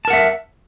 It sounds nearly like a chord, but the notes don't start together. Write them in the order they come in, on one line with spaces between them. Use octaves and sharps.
A5 A#4 F#5 E5